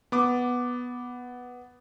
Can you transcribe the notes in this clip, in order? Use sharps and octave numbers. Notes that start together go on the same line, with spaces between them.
B3 D6